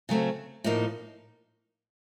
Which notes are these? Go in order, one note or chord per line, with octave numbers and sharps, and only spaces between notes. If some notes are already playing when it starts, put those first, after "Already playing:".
C#3 F#3 A3 C4
A2 F3 A#3 D#4